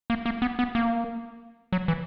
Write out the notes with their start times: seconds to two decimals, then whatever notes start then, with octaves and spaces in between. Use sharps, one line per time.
0.10 A#3
0.26 A#3
0.42 B3
0.59 B3
0.75 A#3
1.72 F#3
1.88 E3